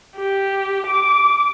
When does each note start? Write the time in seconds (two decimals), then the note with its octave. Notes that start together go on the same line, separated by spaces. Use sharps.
0.17 G4
0.87 D6